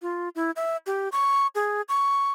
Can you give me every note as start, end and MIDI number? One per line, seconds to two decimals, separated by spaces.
0.02 0.29 65
0.35 0.51 64
0.56 0.77 76
0.87 1.09 67
1.12 1.47 85
1.55 1.82 68
1.89 2.33 85